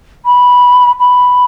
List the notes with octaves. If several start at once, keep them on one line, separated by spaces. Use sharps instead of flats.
B5
B5